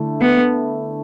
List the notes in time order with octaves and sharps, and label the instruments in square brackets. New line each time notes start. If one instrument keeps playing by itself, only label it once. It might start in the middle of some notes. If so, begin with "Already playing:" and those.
Already playing: [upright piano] D3 A3 E4
[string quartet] B3